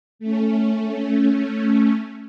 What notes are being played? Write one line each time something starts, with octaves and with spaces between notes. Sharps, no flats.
A3 C#4